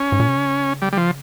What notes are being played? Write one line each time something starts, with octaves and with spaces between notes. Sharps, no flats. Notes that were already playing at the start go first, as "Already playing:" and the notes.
Already playing: C#4
G#2
A#2
C3
C#3
G3
G3
F3